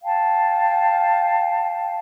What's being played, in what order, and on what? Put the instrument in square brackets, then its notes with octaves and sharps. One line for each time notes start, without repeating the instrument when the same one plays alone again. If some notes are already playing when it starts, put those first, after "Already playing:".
[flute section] F5 G5 A5